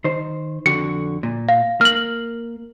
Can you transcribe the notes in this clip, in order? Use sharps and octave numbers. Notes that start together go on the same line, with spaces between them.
D#3 C5
F2 D3 F#4 C#7
A#2
F5
A#3 F6 F#7